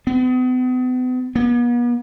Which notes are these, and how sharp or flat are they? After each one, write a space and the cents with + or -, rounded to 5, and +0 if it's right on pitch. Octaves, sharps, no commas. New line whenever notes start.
B3 +40
B3 -40